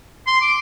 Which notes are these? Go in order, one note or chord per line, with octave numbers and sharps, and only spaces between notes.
C6
D6